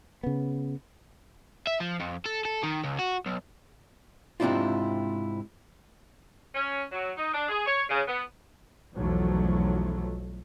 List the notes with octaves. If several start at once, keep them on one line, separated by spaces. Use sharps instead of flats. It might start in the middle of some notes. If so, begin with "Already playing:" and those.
C#3 B3
E5
F3
F2
A4
A4
D#3
C#2
F#4
B1
G#2 C3 C4 D4 E4 F4
C#4
F#3
D#4
D4
G#4
C#5
C#3
B3
B1 E2 F3 F#3 A3